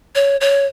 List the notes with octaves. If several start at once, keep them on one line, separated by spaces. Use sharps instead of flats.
C#5
C#5